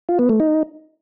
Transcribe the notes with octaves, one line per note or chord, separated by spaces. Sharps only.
F4
B3
A3
D#4